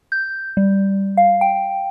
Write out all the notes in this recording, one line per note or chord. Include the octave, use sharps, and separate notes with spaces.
G6
G3
F5
G5